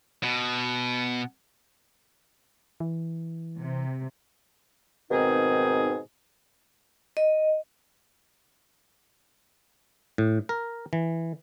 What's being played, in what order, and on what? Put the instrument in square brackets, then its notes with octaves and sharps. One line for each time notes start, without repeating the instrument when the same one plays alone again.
[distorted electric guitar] B2
[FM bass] E3
[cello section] C3
[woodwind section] G#2 B2 D#3 C4 D#4 G#4
[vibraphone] D#5
[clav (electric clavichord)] A2
A#4
E3